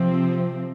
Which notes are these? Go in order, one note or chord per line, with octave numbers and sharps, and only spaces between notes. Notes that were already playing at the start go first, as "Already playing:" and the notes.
Already playing: C3 F3 C4